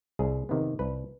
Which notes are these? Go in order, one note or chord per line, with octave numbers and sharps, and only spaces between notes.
C2 G#4
C3 D#3 B3
C2 B4